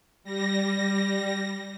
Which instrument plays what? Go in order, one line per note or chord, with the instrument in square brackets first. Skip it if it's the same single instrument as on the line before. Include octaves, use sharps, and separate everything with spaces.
[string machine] G3 A#6